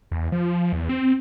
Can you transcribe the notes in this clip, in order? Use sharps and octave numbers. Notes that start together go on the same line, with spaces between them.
E2
F3
E2
C4